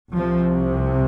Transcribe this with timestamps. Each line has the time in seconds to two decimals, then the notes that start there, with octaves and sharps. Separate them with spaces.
0.15 C2 C3 F3